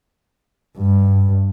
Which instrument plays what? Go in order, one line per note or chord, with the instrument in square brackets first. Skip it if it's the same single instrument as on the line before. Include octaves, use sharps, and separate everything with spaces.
[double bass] G2